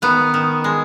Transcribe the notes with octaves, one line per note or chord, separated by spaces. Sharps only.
D#3 B3
D#3
G#3